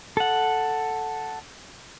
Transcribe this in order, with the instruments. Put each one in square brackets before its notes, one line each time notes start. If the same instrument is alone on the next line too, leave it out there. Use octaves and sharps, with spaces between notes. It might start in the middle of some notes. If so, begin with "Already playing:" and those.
[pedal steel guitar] A4 F#5